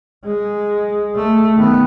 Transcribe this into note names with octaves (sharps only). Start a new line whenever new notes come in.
G#3
A3
D#3 B3